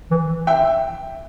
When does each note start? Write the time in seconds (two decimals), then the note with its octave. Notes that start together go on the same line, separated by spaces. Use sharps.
0.11 E3
0.47 E5 G5